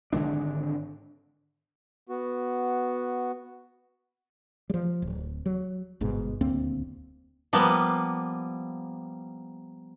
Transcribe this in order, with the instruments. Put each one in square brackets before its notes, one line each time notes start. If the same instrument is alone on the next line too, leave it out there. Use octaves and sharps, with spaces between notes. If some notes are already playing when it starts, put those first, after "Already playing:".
[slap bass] G#1 D3 G#3 D4
[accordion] B3 F#4
[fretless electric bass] F3 G3
D1
F#3
G1 G#2 B2
D#1 D2 A#3 C4
[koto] F3 G3 A#3 B3